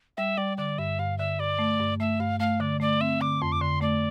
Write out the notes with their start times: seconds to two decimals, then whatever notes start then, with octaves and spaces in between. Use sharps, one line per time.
0.17 G3 E5
0.38 G3 D5
0.58 D3 D5
0.78 G2 E5
0.99 G2 F5
1.18 D3 E5
1.39 G2 D5
1.59 A3
1.80 G2
2.00 A3 E5
2.20 G2 F5
2.40 A3 F5
2.60 D3 D5
2.80 A3 D5
3.00 C4 E5
3.21 D3 D6
3.42 F2 C6
3.52 D6
3.61 D3 C6
3.81 A3 D5